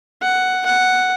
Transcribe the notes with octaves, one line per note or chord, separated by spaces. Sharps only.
F#5
F#5